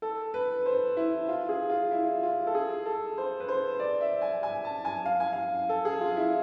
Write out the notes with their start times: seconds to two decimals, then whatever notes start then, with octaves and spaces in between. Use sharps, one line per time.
0.02 A4
0.34 B4
0.66 C5
0.97 E4
1.29 F4
1.49 G#4
1.70 F4
1.91 E4
2.23 F4
2.47 A4
2.55 G#4
2.86 A4
3.18 C5
3.40 B4
3.48 C5
3.80 D5
4.01 E5
4.22 G#5
4.43 G#5
4.65 A5
4.85 G#5
5.06 F5
5.20 G#5
5.33 F5
5.69 A4
5.85 G#4
6.01 F4
6.17 E4